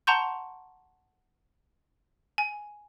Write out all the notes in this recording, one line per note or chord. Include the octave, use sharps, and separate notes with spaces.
F#5 A5 A#5 C6 C#6 G6
G#5